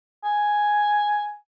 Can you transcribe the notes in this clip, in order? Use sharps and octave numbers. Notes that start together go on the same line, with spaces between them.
G#5